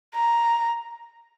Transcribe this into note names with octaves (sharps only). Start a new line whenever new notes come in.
A#5